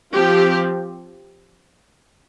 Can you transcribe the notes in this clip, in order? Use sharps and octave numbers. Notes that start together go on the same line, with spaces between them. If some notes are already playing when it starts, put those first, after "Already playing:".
F3 C4 G4